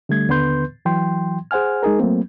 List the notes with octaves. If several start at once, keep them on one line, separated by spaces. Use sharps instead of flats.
D3 G3 A3 G#6
D#2 D3 B3 B4 C6 G6
E3 F#3 G5 C6
G#4 C5 F#5 G#5 F6
G#3 D#4 G#4 A#4
F#3 A3 A#3 C4